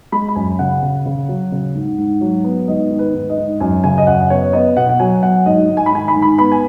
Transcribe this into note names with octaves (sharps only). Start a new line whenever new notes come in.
G#3 B5
B5
F#2 G#5
C#3 F#5
C#3
C#3
F#3
C#3
G#2
G#2
F#3
B3
G#2 D#5
D#3
B4
G#2
D#5
G#2
F#2 G#5
C#3 G#5
D#5
F#2 F#5
B3 C#5
B3 D#5
B2 F#5
F#5
F#3 G#5
F#3 F#5
G#2 D#5
G#2
G#5
B5
D#3 G#5
B5
G#2
B5
B3 B5
G#5